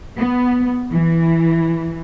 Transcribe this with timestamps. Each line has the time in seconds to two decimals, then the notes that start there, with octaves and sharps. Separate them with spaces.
0.17 B3
0.91 E3